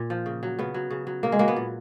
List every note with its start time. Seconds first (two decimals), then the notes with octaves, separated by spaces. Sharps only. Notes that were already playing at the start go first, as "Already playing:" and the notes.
Already playing: A#2
0.10 F3
0.26 C#3
0.43 F#3
0.59 C#3 B3
0.74 F#3
0.91 C#3
1.07 F#3
1.23 C#3 A#3
1.32 G#3
1.39 F#3 A#3
1.48 B3
1.56 A#2